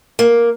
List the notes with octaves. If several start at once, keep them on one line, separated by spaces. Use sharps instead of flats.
A#3